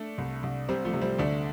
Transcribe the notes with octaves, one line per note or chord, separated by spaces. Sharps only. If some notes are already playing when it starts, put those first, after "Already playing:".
Already playing: A3 D4
C2
C2
C3 G3 C4
F3 A3
C3
G3 C4
D2 A3 D4